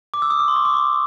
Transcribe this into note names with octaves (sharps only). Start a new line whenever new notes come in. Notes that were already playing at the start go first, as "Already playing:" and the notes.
D6
E6
D#6
D6
C6
C#6
D6
C#6